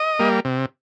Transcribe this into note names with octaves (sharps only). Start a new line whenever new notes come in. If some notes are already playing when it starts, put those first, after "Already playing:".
Already playing: D#5
G3 A#3
C3